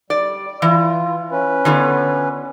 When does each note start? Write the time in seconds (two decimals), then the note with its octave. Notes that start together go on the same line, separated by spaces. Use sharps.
0.10 G3 D5
0.62 E3 F4
1.31 C#4 B4
1.65 D3 B3 F4